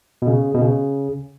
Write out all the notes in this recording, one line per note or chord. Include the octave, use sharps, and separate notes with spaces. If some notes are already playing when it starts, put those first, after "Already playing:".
B2
C#3
B2
C#3